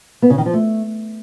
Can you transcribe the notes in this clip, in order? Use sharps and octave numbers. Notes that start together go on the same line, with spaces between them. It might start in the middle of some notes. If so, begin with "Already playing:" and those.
B3
C#3
D#3
F3
A3